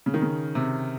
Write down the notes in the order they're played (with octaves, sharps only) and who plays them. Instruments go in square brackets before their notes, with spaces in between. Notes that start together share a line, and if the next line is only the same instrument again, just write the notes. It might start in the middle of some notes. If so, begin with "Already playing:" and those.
[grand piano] C#3
D#3
C#3
C3